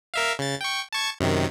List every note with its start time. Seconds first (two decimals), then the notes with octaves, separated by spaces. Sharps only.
0.14 A#4 E5 F5
0.39 C#3 A6
0.61 G5 C#6
0.93 A5 C#6 G#6
1.20 F#2 C3 D#3